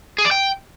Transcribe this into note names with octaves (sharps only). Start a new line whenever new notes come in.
G#4
D5
G5